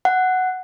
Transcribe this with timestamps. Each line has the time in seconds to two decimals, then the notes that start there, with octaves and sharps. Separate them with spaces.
0.05 F#5